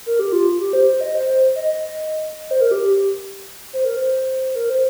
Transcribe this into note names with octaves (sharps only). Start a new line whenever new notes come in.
A#4
G4
F4
G4
C5
C5
D#5
C5
C5
D#5
D#5
C5
A#4
G4
G4
C5
A#4
C5
A#4
C5